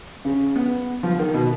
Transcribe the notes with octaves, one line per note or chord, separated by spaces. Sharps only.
C#3
B3
F3
D#3
B2